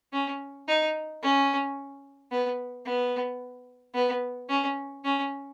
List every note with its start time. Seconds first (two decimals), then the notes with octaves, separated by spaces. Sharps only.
0.13 C#4
0.68 D#4
1.23 C#4
2.31 B3
2.85 B3
3.94 B3
4.49 C#4
5.04 C#4